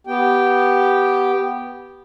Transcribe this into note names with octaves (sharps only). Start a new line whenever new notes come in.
B3 G4 G5